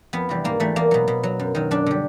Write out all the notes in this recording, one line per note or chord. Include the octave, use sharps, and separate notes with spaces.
F2 B3
C3 E3 G3
G#2 A#3
E3 G3 A3
E2 A#3
B2 F#3
B2
F#3
F#2
D#3 F#3
F#2 D4
D3 G3